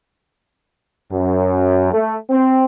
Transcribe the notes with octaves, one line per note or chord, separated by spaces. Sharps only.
F#2
A3
C4